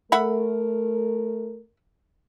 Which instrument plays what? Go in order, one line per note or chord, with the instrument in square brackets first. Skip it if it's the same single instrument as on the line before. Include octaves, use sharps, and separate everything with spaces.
[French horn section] A3 A#4 [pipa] E5 F#5 B5